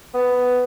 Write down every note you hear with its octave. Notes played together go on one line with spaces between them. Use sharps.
B3